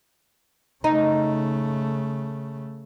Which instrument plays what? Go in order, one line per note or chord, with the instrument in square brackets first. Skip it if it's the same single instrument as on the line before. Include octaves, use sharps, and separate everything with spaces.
[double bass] C#3 A3 [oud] D#4